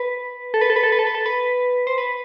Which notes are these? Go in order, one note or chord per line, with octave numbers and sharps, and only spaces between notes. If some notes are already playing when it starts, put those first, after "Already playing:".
Already playing: B4
A4
B4
A4
B4
A4
B4
A4
B4
A4
B4
C5
B4